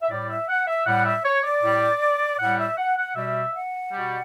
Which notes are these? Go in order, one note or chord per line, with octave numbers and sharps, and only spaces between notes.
E5
A2 G3 D5
E5
F#5
E5
A2 G3 F#5
E5
C#5
D5
A2 G3
A2 G3 F#5
E5
F#5
F#5
B2 G3 E5
F#5
B2 G3